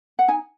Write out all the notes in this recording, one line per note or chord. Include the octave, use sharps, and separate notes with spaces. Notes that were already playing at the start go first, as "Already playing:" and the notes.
F#5
D#4 G#5